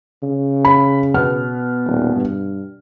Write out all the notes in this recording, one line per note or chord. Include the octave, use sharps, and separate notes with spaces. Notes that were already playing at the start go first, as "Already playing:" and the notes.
C#3
B5
B2 B3 F6
D#1
G2